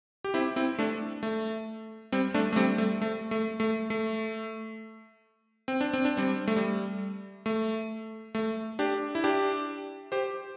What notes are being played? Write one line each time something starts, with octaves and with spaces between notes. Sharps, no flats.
G4
C4 E4
C4 E4
A3 D4
A3
G3 C4
A3 D4
A3
G3 C4
A3
A3
A3
A3
A3
C4
D4
C4
D4
G3 C4
A3
G3
A3
A3
D4 G4
E4
D4 G4
G4 C5